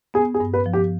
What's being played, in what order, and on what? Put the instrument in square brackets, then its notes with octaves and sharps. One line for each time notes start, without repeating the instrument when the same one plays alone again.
[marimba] B3 [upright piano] G#4
[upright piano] G#4
[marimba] G2
[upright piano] B4
[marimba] F3
[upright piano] G4